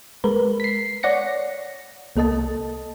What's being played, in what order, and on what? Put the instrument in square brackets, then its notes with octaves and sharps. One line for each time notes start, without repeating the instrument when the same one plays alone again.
[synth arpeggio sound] G#3 A#4 B4
B6 C7
C#5 D5 F#5 A#6 C#7
C2 A#3 A4 D#5 A5